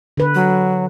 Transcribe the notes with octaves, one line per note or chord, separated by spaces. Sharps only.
D3 B4
F#3